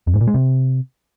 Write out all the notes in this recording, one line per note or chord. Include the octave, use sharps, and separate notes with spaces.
F2
G#2
A#2
G#3
C3